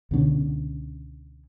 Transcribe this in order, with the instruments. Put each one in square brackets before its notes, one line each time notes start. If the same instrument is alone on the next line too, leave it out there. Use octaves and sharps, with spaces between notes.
[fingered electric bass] C#2 B2 D3 C#4